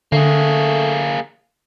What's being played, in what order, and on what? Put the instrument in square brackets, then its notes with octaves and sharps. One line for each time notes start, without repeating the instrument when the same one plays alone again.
[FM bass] D3 [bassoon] A3 [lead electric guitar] A#3 G#4